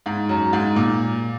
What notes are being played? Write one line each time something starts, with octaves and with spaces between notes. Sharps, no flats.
G#2
F#2
G#2
A#2